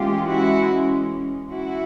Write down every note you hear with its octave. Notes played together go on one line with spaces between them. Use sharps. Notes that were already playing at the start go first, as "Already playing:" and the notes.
Already playing: E3 G#3 C#4 F4 G4
E4 F#4
E4 F#4